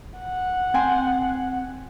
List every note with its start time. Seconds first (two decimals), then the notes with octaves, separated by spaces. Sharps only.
0.20 F#5
0.74 C4 G5 G#5 C6